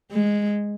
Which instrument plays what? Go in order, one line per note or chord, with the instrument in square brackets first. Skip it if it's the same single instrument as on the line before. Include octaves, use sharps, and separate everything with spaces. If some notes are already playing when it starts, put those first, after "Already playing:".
[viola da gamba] G#3